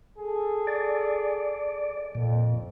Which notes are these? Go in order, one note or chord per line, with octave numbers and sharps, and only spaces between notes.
G#4 A4
D5
F2 A#2